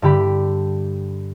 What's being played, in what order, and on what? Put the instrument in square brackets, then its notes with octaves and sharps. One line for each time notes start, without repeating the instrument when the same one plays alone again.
[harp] G2 D3 G4 B5